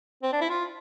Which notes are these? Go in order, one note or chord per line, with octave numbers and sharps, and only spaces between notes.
C4
D4
E4
F4